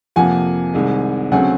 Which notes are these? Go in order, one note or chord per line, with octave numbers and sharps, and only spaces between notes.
F2 C3 F3 A#3 F#5 G#5
C2 C3 D#3 G#3
D2 C#3 F#3 A3 C4 F#5 G#5